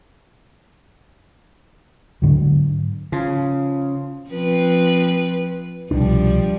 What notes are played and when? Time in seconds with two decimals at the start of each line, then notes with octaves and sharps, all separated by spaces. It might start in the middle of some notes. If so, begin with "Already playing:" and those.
2.22 G#2 D3 F#3
3.12 C#3 F3
4.30 F3 C4 B4
5.91 C2 B2 F3 G3 D4